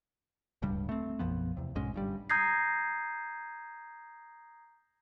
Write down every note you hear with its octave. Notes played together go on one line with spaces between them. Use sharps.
D1 C#2 G2 G3
A3 C4
B1 F#2 F3 B3
E2 C3
B1 G#2 G#3 C#4
G1 G2 G3
A#5 D#6 G6 G#6 A#6 C7